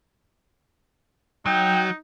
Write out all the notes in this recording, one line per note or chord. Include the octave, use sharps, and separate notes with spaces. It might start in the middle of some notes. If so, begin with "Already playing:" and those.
F#3 D#4 G5